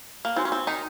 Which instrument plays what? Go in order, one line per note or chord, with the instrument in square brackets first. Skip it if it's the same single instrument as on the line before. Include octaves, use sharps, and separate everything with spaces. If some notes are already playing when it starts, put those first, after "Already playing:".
[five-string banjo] A#3
[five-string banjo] C4 [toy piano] D#4 F#4 C#5 G#5 C6
[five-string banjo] C#4
C4
D#3 D#4